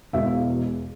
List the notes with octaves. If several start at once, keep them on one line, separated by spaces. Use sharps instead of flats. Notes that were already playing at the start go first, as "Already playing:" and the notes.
E1 E2 B2 G#3 E5
F5